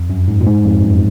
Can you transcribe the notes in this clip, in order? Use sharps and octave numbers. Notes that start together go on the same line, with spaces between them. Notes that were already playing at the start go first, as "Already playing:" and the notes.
Already playing: F2
F#2
G#2
A#2
G#2
F2
F#2